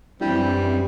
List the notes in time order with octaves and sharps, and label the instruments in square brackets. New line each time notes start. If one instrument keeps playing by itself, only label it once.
[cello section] F#2 E3 C4 [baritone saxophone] G3 [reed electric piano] D4 E4 G4